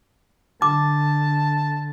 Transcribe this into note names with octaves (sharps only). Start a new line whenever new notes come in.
D3 A5 D6